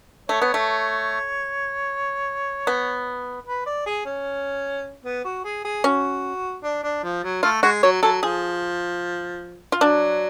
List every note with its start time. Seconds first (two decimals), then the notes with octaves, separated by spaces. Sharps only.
0.29 A3 C#5
0.42 B3
0.54 A3
2.67 B3
3.47 B4
3.66 D5
3.86 G#4
4.06 C#4
5.05 B3
5.25 F#4
5.45 G#4
5.65 G#4
5.84 C#4 F#4
6.64 D4
6.84 D4
7.03 F3
7.23 F#3
7.43 A3 F4
7.63 G#3 F#4
7.83 F#3 C#5
8.03 F#3 A4
8.23 F3 G#4
9.72 F4
9.81 F#3 D4